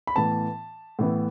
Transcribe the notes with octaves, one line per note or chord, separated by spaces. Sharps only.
B5
A2 E3 B3 A5
A2 E3 B3